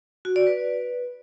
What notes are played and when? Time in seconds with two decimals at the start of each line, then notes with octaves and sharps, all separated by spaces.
0.25 F#4
0.36 D5
0.47 B4